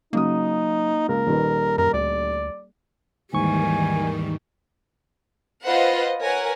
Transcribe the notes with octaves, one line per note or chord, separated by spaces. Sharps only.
C#3 F#3 A#3 D#4 D#6
C#2 A#4
D#1 D#3 B4
F#2 A#4
D2 D5
D#2 G#2 D#3 E3 G3 G#5 C#6
F4 B4 C5 D#5 F#5
A#4 B4 C#5 F#5 G#5